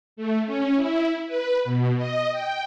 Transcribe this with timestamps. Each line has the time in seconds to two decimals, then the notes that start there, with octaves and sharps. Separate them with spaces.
0.16 A3
0.46 C#4
0.75 E4
1.27 B4
1.64 B2
1.97 D#5
2.32 G5